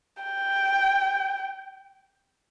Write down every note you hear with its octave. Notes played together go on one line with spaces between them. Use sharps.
G5